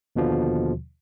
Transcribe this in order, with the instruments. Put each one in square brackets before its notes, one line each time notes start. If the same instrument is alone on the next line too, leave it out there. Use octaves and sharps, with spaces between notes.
[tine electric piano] D#2 B2 D3 F3